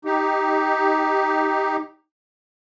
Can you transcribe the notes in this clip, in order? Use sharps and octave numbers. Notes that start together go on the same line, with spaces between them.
D#4 G4